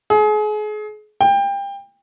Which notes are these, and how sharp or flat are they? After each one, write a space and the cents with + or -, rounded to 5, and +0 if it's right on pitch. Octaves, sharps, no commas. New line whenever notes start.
G#4 +35
G5 +25